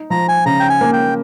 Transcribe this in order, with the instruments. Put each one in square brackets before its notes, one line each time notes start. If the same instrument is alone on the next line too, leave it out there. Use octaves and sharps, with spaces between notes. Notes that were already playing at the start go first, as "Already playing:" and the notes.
Already playing: [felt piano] D#4
[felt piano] F3 [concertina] A#5
[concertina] G#5
[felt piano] C#3 [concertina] A#5
[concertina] G5
G#5
[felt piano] A#3
[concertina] G5